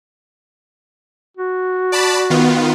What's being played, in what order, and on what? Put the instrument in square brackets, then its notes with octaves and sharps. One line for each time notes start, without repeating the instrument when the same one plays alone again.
[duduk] F#4
[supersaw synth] D5 A5 B5
D#3 B3 F4